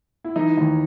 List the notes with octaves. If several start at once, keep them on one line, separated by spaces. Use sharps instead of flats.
E4
E3 D#4
D#2